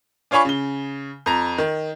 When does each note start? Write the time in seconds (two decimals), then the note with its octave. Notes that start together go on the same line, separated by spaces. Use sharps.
0.31 D4 F4 C#5 G#5 B5 C#6
0.45 C#3 G7
1.26 F2 A#5
1.58 D#3